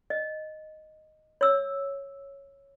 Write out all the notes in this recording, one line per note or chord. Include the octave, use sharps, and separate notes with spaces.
D#5
C#5 E6